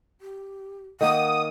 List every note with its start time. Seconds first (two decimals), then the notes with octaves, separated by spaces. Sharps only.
0.21 G4
1.01 D#3 A#3 F#5 D#6